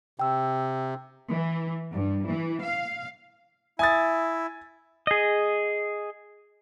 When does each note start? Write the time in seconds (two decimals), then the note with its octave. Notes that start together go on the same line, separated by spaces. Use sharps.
0.19 C3 G5 E6
1.29 E3
1.93 G2
2.26 E3
2.61 F5
3.79 E4 E5 G#5 D#6 A6
5.07 G#4 D#5